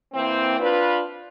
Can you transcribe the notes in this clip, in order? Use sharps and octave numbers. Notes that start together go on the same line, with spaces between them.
E3 A#3 C4
D4 F4 B4